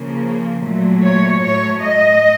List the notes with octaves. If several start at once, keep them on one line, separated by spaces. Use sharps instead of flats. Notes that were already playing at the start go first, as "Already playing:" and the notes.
Already playing: C#3 F3 A#3
A#2 F#3 A3
C#5
A2 F#3 A3 C#5
D#5